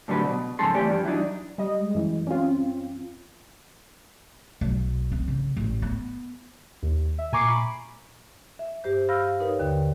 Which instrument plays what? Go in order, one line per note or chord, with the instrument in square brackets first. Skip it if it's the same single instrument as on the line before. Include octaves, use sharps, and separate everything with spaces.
[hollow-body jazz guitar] A2 D3 F#3 G3 C4 B4
B2
F2 G#2 C#3 A4 C6
E3 A3 C4 G4 D5
G2 F3
E3 F#3 D4 D#4
[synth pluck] G3 D#5
[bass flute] G#3
[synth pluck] F#2 E3
[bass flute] C4 [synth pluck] C#4 F4
[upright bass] B1
C4
C#3
A1
B3
[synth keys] D#2
E5
A#2 G#5 A#5 C#6 D6 C7
B5 D6
[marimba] E5
G2 G4 C5 G6
F5 B5 E6 F6 G6 A#6
D#4 A#4 B4 C#5
D#2 D3